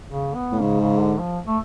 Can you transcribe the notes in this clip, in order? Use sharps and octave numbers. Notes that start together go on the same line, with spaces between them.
C#3
B3
A2
G#2 C#3
C#3
D3
F3
A3